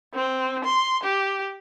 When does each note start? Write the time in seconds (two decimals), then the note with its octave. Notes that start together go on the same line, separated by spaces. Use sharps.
0.14 C4
0.64 C6
1.03 G4